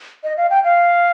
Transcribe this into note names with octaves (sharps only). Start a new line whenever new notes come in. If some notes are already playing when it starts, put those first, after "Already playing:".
D#5
F5
G5
F5